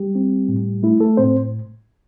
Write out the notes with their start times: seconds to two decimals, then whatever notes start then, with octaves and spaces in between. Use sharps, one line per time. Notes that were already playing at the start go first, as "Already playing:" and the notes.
Already playing: G3 G4
0.15 C4
0.49 A2
0.83 A3 E4
1.00 A3 A4
1.17 A2 C4 C5